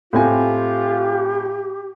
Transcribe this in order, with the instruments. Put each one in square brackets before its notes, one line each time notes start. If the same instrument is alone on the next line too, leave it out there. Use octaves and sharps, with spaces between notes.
[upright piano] A2 C4 G#5 [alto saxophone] F4 [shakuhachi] G4